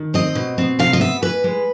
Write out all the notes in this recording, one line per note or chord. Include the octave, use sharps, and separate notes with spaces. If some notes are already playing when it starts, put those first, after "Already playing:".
Already playing: D#3
C4 D#5
B2
C4
C3 F5
D#5
B3 E5
E3 B4
G#3